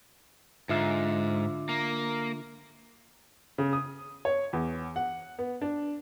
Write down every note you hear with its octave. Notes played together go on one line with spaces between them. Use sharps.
G#2 D3 F4 E5
A#3
C#3
D#6
C#5
E2
F#5
B3
D4